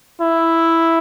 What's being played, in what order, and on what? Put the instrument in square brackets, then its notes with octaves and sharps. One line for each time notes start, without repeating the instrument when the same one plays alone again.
[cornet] E4